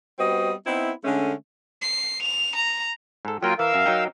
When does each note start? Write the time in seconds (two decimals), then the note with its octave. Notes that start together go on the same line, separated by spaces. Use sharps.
0.19 G3 B3 C4 F#4 D#5
0.66 B3 C4 D#4 E4
1.05 D3 G#3 A3 C#4
1.81 C7
2.22 F7
2.55 A#5
3.25 G#2 A4
3.43 F#3 A#3 F4 A#4 G5
3.59 E3 A#4 F5 E6
3.74 F#2 E5
3.86 F#3 D#4 G5